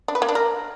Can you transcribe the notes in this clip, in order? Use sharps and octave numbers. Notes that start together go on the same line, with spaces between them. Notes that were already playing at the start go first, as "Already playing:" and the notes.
D4
B4
A#3
D4
A#4